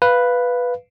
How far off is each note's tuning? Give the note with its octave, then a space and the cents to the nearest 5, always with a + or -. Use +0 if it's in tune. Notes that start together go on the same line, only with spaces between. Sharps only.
B4 +0 F5 +0